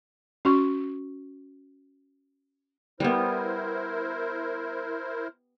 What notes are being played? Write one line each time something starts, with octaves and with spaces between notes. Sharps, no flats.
C#4 F#4 C#6
G3 B3 E4 A#4 C5